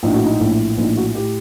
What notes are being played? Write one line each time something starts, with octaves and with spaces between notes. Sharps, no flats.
A#1 A2 D#4
F#4
D#4
A#1 A2
A#1 A2 D#4
F#4
A2 G4